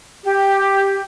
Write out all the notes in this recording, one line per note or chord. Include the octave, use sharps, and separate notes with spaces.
G4